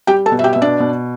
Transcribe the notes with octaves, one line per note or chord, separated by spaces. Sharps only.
G3 G4 G5
A4 A5
B2
E5
G4 G5
B2 E5
D4 D5
B2